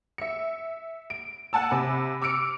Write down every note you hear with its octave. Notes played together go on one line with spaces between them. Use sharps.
E5 C#7
D7
F#5 G#5 A5 E6
C3 B5
D6 E6 F6 C#7 D7